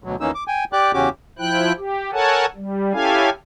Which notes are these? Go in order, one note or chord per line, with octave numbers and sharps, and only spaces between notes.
D2 B2 F#3
D#2 E3 A#3 C#4 D#4 E6
D6
G5 G#5
G4 D5 G5 D6 F#6
E2 C#3 C#4 F#4 G4 D6
F3 E4 G5 F#6
G4
A4 A#4 C#5 F#5 G#5 A5
G3
C#4 E4 G4 A4 F5 G#5